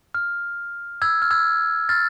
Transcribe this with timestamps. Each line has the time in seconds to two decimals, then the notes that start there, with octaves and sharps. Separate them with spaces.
0.15 F6
1.02 E6 G#6
1.22 F6
1.31 E6 G#6
1.89 F6 A6